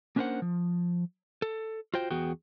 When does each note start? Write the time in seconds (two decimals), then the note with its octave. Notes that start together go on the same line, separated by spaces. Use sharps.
0.16 A#3 C#4 D4 A#4 C5 F#5
0.42 F3
1.42 A4
1.94 F4 F#4 C5 G5
2.10 E2 B3 F#4 G#4 G5